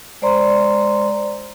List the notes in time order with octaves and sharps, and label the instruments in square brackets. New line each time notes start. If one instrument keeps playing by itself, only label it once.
[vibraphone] G#3 C5 D5 A#5 C6